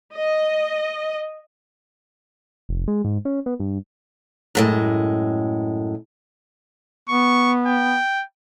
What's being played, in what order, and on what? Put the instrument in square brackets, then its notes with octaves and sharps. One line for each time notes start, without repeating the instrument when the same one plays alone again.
[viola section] D#5
[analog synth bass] F1
G#3
G#2
C#4
B3
G2
[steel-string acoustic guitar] F#2 A2 G#3
[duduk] B3 [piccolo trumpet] C#6
[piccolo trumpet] G5